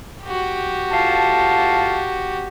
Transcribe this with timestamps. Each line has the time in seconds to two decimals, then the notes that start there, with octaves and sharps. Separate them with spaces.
0.24 F#4 G4
0.92 A2 F4 A5